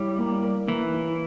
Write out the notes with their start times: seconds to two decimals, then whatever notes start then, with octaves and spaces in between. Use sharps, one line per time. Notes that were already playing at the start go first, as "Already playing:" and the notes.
Already playing: G3 E4 C#5
0.18 A#3
0.43 A#4
0.68 E3 A#3
0.93 E4